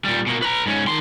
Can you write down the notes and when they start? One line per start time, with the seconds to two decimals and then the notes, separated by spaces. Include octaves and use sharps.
0.04 A#2 G3
0.26 B2 A#3
0.42 B4 A#5
0.66 G#2 C#4
0.87 D#3 C6